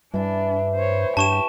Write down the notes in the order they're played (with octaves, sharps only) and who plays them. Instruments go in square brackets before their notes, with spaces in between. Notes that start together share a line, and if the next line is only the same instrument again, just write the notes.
[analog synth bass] G2 [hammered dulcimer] E3 E4 [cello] D4
[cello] C5 C#5
[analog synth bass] G2 [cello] G4 [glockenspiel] A5 C#6 E7